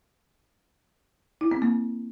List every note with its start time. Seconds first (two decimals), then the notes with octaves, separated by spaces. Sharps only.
1.41 E4
1.51 C4
1.62 A#3